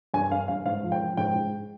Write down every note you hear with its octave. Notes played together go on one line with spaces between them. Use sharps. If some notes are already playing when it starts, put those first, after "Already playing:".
G2 G#5
G2 F5
G2 F5
G#2 F5
F3
G5
F3
G#2 G5
G#2